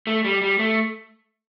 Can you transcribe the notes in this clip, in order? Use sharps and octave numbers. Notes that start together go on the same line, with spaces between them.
A3
G3
G3
A3